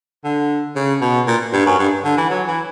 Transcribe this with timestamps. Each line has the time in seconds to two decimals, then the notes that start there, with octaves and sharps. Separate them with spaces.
0.25 D3
0.76 C#3
1.02 B2
1.27 A#2
1.53 G2
1.66 F#2
1.79 G2
2.04 D3
2.17 E3
2.30 F#3
2.48 E3